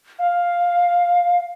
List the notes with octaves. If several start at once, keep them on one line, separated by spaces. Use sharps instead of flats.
F5